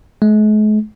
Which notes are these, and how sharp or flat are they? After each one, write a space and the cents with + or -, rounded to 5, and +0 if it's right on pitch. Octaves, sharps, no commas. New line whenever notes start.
G#3 +45